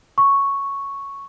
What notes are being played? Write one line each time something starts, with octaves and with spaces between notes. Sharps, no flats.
C#6